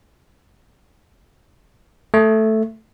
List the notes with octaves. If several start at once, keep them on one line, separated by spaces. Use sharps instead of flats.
A3